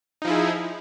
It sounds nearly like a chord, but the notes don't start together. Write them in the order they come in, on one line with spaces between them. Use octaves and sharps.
D#4 F3 E4 G#4